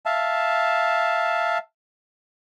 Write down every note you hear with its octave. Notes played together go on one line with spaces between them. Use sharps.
E5 F5 A5